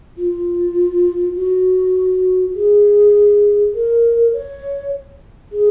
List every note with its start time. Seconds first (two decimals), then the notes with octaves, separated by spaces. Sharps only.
0.18 F4
1.36 F#4
2.55 G#4
3.74 A#4
4.33 C#5
5.52 G#4